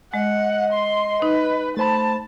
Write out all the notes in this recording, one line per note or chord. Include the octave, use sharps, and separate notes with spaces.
G#3 D#5 F#5
C6
D#4 B4
A3 C5 A5 B5